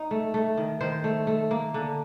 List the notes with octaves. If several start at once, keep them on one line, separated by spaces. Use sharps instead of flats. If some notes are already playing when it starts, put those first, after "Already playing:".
Already playing: D#4
A3
A3
D#3
D#3 C5
A3
A3
A#3
D3